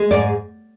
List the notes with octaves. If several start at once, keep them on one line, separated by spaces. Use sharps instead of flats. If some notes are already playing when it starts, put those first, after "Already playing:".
Already playing: G#3
G#2 D5